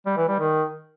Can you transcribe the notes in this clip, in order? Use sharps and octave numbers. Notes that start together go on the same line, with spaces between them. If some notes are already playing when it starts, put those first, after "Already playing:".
G3
E3
G3
D#3